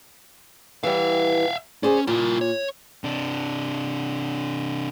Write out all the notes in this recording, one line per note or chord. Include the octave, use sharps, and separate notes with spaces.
E3 G3 E5 F5
C#4 G#4 C5 D5
A#2 E4 A#4
C#5
C3 D4